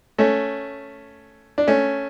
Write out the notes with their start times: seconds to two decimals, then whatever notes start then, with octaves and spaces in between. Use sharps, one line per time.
0.18 A3 C#4
1.58 D4
1.67 A3 C#4